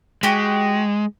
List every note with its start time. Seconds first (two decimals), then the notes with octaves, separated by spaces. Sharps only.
0.23 G#3 F#4 G4